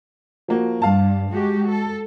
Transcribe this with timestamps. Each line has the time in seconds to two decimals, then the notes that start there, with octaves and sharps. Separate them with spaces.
0.48 F3 A#3 F#4
0.82 G2 F5 A5
1.31 G#3 F#4 G4
1.69 A4